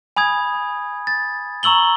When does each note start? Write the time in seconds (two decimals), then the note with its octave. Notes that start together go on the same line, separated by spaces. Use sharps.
0.16 G#5 B5 D#6 G#6
1.07 A6
1.63 A#5 C#6 E6 F#7 G7